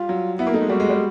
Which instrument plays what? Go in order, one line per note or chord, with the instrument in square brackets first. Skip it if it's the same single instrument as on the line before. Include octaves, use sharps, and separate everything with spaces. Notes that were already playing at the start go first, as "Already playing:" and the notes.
Already playing: [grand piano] G3 [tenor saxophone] F4
[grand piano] F#3
[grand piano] B3 [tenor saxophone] E4
[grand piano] A#3
[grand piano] A3 [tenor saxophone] D#4
[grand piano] G#3
[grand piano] G3 [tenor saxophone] F#4
[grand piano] G#3
G3